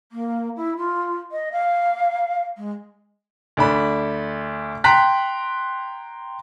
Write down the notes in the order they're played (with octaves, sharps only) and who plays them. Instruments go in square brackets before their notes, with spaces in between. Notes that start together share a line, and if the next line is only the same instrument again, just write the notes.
[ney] A#3
E4
F4
D#5
F5
G#3
[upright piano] D2 D4 B5
G5 A#5 C6 F#6 B6